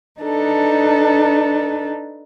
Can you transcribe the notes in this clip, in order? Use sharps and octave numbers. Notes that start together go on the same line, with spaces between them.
D4 D#4 A4 B4